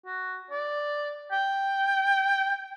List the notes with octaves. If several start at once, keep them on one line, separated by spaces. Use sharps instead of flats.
F#4
D5
G5